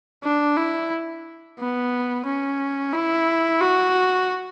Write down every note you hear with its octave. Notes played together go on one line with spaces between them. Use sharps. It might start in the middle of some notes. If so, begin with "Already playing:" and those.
D4
E4
B3
C#4
E4
F#4